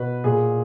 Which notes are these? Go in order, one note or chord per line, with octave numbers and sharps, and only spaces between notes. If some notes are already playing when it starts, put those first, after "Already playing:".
Already playing: B2 B4
A#2 G#4